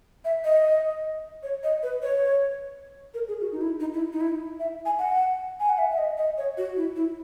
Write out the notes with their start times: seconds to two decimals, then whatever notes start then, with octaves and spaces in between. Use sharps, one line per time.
0.25 E5
0.45 D#5
1.43 C#5
1.63 D#5
1.83 B4
2.02 C#5
3.14 A#4
3.28 G#4
3.41 F#4
3.52 D#4
3.61 E4
3.80 D#4
3.94 E4
4.12 D#4
4.21 E4
4.60 E5
4.86 G#5
4.99 F#5
5.60 G#5
5.69 F#5
5.78 E5
5.91 E5
5.98 D#5
6.17 D#5
6.38 C#5
6.58 F#4
6.77 E4
6.96 E4